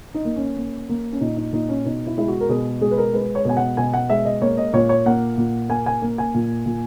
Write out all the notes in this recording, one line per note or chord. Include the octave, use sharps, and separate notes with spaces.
D#4
A#3
C#4
A#3
A#3
C#4
A#2 D#4
D#4
A#2 D#4
C#4
B2 D#4
E4
G#3 E4
F#4
A#4
B2 G#4
G#3 G#4
B4
A#4
G#3 B4
C#5
B2 G#5
F#5
B2 G#5
F#5
G#3 E5
D#5
A#3 C#5
D#5
A#2 C#5
C#5
A#3 F#5
A#2
A#3 G#5
G#5
A#3
G#5
A#2
A#2